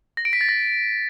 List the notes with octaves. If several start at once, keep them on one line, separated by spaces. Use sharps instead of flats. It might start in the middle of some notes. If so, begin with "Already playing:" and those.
A#6
D7
B6
A6
A#6